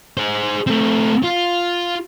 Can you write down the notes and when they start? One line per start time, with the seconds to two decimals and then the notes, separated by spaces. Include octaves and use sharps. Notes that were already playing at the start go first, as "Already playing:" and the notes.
0.17 G#4 C5
0.67 A3 C4
1.24 F4